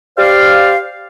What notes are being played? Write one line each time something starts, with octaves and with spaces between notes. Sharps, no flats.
G4 C5 D5 F5